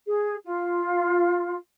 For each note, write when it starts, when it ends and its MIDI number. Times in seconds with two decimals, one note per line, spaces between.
0.06 0.35 68
0.45 1.55 65